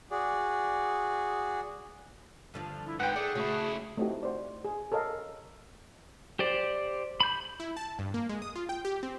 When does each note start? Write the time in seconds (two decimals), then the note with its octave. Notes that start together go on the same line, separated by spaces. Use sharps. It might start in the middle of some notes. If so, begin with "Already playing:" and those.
0.11 F#4 G#4 D5
2.54 G2 D3 F3
2.86 E4
3.00 G#2 D#3 B4 F#5 G5
3.16 A3 G#4 D5
3.35 C#3 A3 C#4 E4 F#4
3.98 A3 C4 D#4 E4 F#4 G4
4.23 F#4 C5 D5
4.65 G#4
4.92 A4 A#4 C#5 D#5 F5
6.39 G4 C5 D5
7.20 B5 G6
7.60 E4
7.77 A5
7.99 G2
8.14 A#3
8.29 G#3
8.42 D#6
8.55 F4
8.69 G5
8.85 G4
9.03 C4